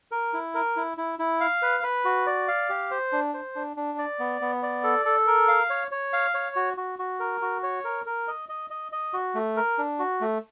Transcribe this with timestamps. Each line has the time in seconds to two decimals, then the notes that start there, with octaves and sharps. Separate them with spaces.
0.12 A#4
0.33 E4
0.55 A#4
0.76 E4
0.97 E4
1.19 E4
1.41 F5
1.62 B4
1.83 B4
2.05 F#4
2.27 D5
2.48 F5
2.69 G4
2.91 C5
3.12 D4
3.34 C5
3.55 D4
3.77 D4
3.98 D5
4.19 B3
4.41 B3
4.63 D5
4.84 A4
5.06 A4
5.27 A#4
5.48 F5
5.70 C#5
5.91 C#5
6.13 F5
6.34 C#5
6.56 F#4
6.77 F#4
6.99 F#4
7.20 A#4
7.42 F#4
7.63 C#5
7.85 A#4
8.06 A#4
8.28 D#5
8.49 D#5
8.70 D#5
8.92 D#5
9.13 F#4
9.35 A3
9.57 A#4
9.78 D4
9.99 F#4
10.21 A3